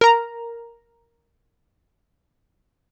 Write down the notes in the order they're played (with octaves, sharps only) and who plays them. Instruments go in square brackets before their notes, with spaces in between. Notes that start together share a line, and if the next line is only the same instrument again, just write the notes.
[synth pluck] A#4 A#5